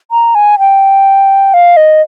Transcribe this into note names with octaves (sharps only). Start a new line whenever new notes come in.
A#5
G#5
G5
F5
D#5